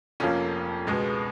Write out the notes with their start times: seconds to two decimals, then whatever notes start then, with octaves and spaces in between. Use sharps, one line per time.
0.20 F1 F2 F3 A#3 C#4
0.87 C#2 B2 G#3 B3